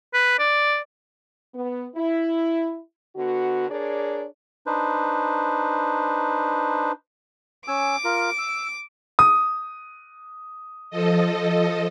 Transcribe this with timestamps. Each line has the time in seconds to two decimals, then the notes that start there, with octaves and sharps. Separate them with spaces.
0.14 B4
0.39 D5
1.55 B3
1.96 E4
3.16 D3 B3 F#4
3.69 D4 G#4 A#4 C#5 D5
4.67 D4 D#4 B4 C5
7.68 C#4 G#5 D6 E6
8.05 F4 A#4
8.38 E6
9.19 D#6
10.90 F3 A4 D#5